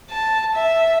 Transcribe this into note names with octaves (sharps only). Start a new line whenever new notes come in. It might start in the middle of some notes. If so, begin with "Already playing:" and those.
A5
E5